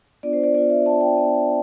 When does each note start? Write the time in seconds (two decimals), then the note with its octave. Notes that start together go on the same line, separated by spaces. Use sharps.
0.23 B3 D4 F4 D5
0.33 C5
0.43 D5
0.54 B3 D4 F4 D5
0.70 E5
0.85 B3 D4 F4 A5
1.01 G5
1.17 B3 D4 F4